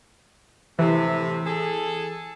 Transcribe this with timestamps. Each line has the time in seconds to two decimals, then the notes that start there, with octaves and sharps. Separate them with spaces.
0.79 A2 C3 E3
1.46 G#4 A4